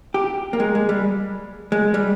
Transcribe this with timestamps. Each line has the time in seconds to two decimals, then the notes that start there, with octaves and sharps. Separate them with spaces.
0.14 G4
0.53 A#3
0.60 G#3
0.75 G#3
0.89 G3
1.72 G#3
1.94 G3